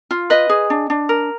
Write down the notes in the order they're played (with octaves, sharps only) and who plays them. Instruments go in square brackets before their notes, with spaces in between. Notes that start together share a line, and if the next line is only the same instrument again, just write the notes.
[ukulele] F4
B4 D#5
G#4
D4
D4
A#4